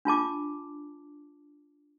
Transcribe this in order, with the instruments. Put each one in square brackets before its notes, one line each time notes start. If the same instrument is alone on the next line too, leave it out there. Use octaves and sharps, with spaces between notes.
[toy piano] D4 F4 A5 D6